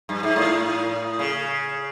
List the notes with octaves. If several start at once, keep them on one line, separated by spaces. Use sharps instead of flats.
G2
G#2
A2
C#3